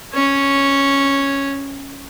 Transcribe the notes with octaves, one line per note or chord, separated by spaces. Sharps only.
C#4 C#5